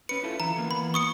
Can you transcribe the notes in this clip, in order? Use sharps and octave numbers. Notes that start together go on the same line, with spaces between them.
C#4 B4 C#7
E4 F4 A4
E3 A#5
E3 A#3 B3
B5
C#6 D#6 C#7